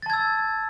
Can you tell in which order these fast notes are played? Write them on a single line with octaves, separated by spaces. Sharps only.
A6 A5 G#6 E6